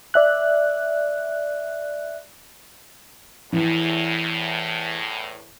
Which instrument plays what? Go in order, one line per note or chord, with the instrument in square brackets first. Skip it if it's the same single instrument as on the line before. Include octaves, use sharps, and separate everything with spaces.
[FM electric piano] D5 E5 F#6
[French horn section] E2 A2 [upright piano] E3